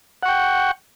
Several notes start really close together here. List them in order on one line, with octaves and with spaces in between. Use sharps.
F#5 C#6 G5